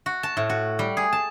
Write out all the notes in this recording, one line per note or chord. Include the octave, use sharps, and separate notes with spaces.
F#4
A5
A2
F#4
G3
G#4
A5